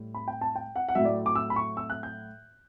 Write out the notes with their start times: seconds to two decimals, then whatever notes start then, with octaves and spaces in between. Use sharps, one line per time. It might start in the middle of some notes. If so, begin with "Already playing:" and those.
Already playing: A2 G3
0.14 B5
0.28 G5
0.41 A5
0.56 G5
0.76 F#5
0.89 F#5
0.95 A2 F#3 E5
1.05 D5
1.26 D6
1.35 E6
1.50 B5
1.56 C#6
1.77 E6
1.90 F#6
2.03 G6